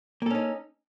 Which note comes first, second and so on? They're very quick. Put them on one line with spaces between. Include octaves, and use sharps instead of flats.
A#3 A4 C#4 D#4